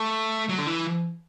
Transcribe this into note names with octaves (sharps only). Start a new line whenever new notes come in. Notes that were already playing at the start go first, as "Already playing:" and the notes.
Already playing: A3
F#3
D3
E3